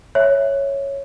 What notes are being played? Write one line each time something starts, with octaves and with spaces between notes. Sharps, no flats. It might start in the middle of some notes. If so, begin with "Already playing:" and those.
C#5 E5